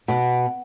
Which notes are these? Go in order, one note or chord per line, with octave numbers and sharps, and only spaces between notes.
B2